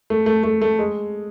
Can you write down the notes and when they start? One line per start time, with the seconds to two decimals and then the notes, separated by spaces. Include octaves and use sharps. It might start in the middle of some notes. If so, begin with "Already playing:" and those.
0.10 A3
0.26 A3
0.43 A3
0.62 A3
0.79 G#3